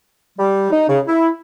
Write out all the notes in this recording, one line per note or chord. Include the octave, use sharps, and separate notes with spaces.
G3
D#4
C#3
E4